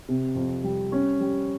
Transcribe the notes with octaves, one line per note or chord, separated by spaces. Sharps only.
C3
F2
G3
C#4
G3